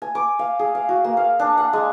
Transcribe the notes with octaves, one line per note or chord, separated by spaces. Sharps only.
G#5
D6
F5
G#4
F5
F#4
A#3
F5
D4
F#5
G#3